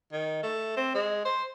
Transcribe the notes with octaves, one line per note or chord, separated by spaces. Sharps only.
D#3
A3
C4
G#3
C5